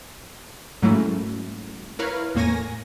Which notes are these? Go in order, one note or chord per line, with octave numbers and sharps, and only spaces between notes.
G#2 F#3 A3 A#3 C#4 E4
E4 A#4 B4 C#5 F5
E2 A2 A#3 C#5 G#5 A#6